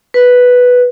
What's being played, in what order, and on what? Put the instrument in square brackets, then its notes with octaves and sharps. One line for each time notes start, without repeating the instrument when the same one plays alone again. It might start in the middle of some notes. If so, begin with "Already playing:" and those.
[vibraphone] B4